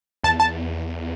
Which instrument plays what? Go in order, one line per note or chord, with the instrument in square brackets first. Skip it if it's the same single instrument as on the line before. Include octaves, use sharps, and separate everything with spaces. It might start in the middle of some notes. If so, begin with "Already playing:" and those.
[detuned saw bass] E2 [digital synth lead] A5
[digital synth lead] A5